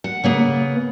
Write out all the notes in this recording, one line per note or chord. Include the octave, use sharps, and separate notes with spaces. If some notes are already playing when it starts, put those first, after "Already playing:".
F#5
C#3 A#3 B3